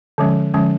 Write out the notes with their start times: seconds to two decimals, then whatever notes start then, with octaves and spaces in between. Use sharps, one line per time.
0.18 D3 F3 G#3 C#4
0.54 D3 F3 G#3 C#4